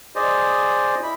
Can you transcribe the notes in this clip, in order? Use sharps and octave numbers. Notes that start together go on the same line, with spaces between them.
G#4 C5 D5 D#5
E4 B5